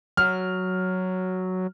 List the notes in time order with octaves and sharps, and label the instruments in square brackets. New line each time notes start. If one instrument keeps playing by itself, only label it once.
[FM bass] F#3 [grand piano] F6